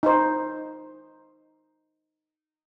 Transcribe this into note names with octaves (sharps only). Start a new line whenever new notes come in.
D#4 C5